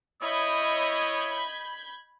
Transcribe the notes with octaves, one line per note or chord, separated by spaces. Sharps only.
E4 C#5 D#5 B5 D#6 G6 G#6